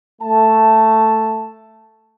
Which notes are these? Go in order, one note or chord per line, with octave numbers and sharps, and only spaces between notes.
A3 A5